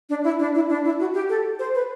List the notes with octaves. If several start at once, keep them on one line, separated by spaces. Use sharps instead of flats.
D4
E4
D4
E4
D4
E4
F#4
G4
A4
C5
B4